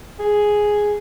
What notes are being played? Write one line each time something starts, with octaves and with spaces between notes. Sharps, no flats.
G#4